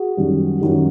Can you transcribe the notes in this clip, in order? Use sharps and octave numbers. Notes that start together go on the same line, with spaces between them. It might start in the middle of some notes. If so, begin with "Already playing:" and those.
Already playing: F#4 G#4
F#2 D#3 G3
F#2 D#3 G3